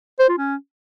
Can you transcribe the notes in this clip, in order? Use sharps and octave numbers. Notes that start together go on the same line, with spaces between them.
C5
F4
C#4